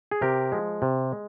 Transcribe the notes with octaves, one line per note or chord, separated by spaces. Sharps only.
G#4
C3 G4 A#4
F3 G#3
C3
G#3